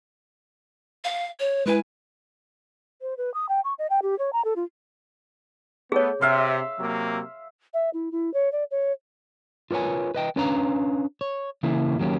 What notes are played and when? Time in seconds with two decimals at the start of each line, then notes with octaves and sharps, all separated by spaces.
1.04 F5
1.39 C#5
1.66 G#3 E4 B4 G#5
3.02 C5
3.17 B4
3.34 D#6
3.49 G5
3.64 C#6
3.79 D#5
3.90 G5
4.02 G4
4.19 C#5
4.33 A#5
4.45 A4
4.56 F4
5.92 A3 B3 G#4 C#5
6.21 C3 E5 F5 C6
6.80 C3 F#3 A#3
7.74 E5
7.93 E4
8.12 E4
8.34 C#5
8.52 D5
8.71 C#5
9.71 F4 A#4 B4 C#5 G#5
10.15 B4 D#5 G5
10.36 C#4 D4 B4 C#5 F5 A#5
11.21 C#5
11.63 C#3 E3 A#3 E4
11.99 D#2 F#3 A#3 C#4 G4